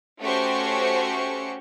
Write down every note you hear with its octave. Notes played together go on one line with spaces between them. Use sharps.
A3 C#4 F#4 G4 C5 C#6